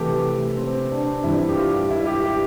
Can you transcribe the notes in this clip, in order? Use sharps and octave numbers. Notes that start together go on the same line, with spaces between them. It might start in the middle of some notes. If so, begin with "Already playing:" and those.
Already playing: C3 E3 A3 C4 G4
C4
D4
G2 E3 G3 C4 E4
G4
F4
E4
G4
G4